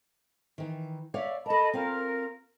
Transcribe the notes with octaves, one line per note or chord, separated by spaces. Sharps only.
D#3 E3
C#5 D5 E5 F5
A4 A#4 D#5 A5 B5
C4 F4 A#4 F5